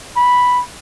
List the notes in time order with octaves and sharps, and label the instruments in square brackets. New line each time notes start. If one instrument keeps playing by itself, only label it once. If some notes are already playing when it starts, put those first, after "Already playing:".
[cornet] B5